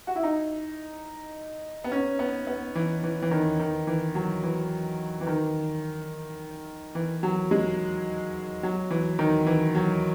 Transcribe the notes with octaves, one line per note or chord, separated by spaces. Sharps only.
F#4
E4
D#4
B3
C#4
B3
B3
E3
E3
E3
D#3
D#3
E3
F#3
E3
E3
D#3
E3
F#3
G#3
F#3
E3
D#3
E3
F#3